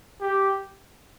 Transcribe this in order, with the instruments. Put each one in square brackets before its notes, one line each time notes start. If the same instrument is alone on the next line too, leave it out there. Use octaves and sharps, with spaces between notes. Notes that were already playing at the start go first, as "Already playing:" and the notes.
[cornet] G4